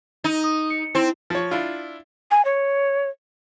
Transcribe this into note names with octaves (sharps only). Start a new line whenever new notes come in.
D#4
D#6
C#7
C4 E4
F3 C#5
D4 E4 F4
G#5
C#5